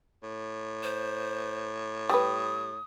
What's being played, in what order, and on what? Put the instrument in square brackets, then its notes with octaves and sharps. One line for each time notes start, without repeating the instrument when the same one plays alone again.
[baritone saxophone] A2
[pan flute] C5
[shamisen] G3 G#4 B4 [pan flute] D#6